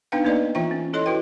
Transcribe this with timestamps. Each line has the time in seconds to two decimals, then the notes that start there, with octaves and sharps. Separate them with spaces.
0.12 B3 D4 D#4 B4 F5 G5
0.25 A#3 B3 D#4 B4 D5 D#5
0.55 E3 F4 E5 G5 A#5
0.71 C#4
0.93 E4 A4 C#5 D#5 C6
1.06 E4 F#4 B4 G5